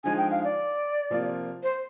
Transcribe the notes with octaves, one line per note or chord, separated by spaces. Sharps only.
D3 F3 G#3 D#4 G#5
G5
F5
D5
C3 F3 A#3 F4
C5